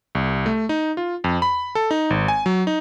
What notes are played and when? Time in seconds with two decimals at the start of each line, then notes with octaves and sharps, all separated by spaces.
0.15 C2
0.46 A3
0.69 D#4
0.97 F4
1.24 F2
1.42 B5
1.75 A4
1.91 D#4
2.10 G#1
2.28 G#5
2.46 F#3
2.67 D#4